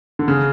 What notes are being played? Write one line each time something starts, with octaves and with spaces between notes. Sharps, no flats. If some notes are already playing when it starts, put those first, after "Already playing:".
D3
C#3